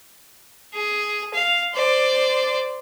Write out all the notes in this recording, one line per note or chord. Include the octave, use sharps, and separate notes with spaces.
G#4
F5
C5 D5